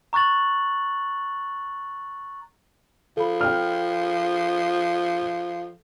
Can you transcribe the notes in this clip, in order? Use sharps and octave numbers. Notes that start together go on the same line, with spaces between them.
A#5 C#6 F#6 A6 F#7
F3 A4 B5
G5 F6